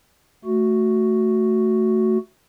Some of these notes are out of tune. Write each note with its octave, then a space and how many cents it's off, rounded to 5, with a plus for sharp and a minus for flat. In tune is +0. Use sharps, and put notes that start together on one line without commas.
A3 +5 F#4 +0